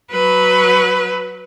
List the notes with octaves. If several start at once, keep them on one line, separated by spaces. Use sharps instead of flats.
F#3 B4